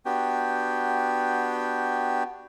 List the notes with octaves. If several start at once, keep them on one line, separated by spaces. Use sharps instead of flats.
B3 D4 F#4 G4 G5